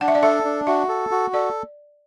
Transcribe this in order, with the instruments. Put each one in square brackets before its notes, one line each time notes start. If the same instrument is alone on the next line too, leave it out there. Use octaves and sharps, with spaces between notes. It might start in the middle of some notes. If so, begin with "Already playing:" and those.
[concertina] D4 [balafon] F#5
[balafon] E5
D5
[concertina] A4 [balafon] E5
[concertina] D4
[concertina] F#4 [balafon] E5
[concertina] A4
F#4
[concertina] A4 [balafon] D5